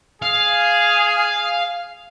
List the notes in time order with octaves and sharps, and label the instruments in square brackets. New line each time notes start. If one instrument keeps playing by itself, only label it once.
[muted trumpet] G#4 [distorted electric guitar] F5